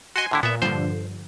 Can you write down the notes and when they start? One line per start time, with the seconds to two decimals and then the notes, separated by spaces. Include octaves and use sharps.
0.16 F#4 D#5 G#5 C6
0.31 A2 D3 E4
0.43 A#2 B3 E5
0.62 G2 D3 F3 C5